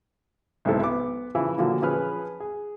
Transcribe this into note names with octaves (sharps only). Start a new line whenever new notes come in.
B1 G#2 C3 E4 A4
B3 D6
C#3 E3 F3 E4
A#2 D3 F3 F#3 A#3
F3 C#4 G#4 B4 F6
G#4